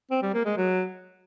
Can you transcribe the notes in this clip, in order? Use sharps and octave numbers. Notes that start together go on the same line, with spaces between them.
C4
G3
A#3
G#3
F#3